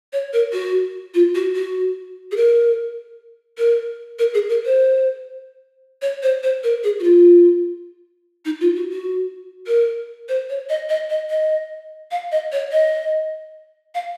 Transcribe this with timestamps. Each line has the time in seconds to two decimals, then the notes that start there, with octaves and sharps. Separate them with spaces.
0.13 C#5
0.33 A#4
0.53 F#4
1.14 F4
1.35 F#4
1.55 F#4
2.32 G#4
2.36 A#4
3.58 A#4
4.19 A#4
4.34 G#4
4.49 A#4
4.66 C5
6.02 C#5
6.23 C5
6.43 C5
6.64 A#4
6.84 G#4
7.00 F#4
7.04 F4
8.45 D#4
8.61 F4
8.76 F#4
8.92 F#4
9.67 A#4
10.29 C5
10.49 C#5
10.69 D#5
10.89 D#5
11.10 D#5
11.30 D#5
12.11 F5
12.32 D#5
12.52 C#5
12.72 D#5
13.95 F5